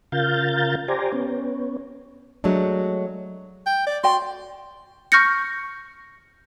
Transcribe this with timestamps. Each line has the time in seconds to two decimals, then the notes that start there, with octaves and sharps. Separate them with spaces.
0.12 C#3 F4 A#4 F5 G6 A6
0.88 G4 C5 D5 G#5 A#5
1.12 B3 C#4
2.44 F#3 G#3 A3 D4
3.66 G5
3.87 D5
4.04 F#4 D5 G5 C6
5.12 C#6 F6 G6 A#6 C#7